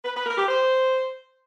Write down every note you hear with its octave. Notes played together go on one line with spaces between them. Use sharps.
B4
B4
A#4
G4
C5